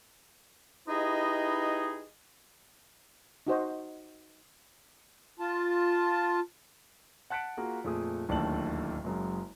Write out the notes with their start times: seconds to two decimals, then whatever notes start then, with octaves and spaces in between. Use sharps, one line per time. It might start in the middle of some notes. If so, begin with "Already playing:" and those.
0.88 D#4 E4 G4 G#4 B4 D#5
3.47 D#4 F#4 C5 D#5
5.39 F4 A5
7.30 F#5 A5 F#6 B6 C#7 D7
7.57 A#3 F4 F#4 G#4
7.84 F2 A#2 A3 G#4 D#6
8.29 D1 D#2 A3 D4 A5 F#7
9.04 F#1 F#2 G#3